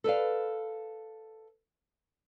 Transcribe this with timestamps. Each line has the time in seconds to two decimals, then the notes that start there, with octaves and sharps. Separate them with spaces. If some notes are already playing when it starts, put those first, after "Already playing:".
0.04 A4 B4 D5 F5